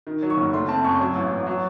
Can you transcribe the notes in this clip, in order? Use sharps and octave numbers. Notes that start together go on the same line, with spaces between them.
D#3
F#3
C#6
F#1
A3 C6
C4 A5
F#2 C#6
F#3
A1
A1
F#3